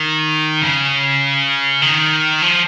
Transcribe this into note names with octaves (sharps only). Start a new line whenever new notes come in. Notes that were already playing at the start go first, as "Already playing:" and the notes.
Already playing: D#3
C#3
D#3
F3